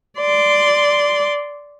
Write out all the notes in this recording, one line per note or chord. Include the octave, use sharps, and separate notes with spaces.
D5 C6